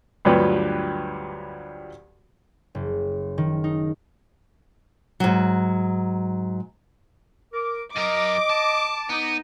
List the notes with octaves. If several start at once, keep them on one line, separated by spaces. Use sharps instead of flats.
D2 G2 F3 F#3 G4 B4
F#1
D#3
D#4
G#2 F#3
A#4 D6
F#2 A#4 D#5 D6
A5
B3 D#4